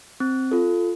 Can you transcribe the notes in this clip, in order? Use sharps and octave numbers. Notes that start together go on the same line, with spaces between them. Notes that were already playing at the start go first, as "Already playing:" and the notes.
C4
F4 A4